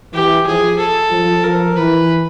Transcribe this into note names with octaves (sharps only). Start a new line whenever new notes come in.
E3 G4
F3 G#4
A4
F3
F3 A#4
E3 B4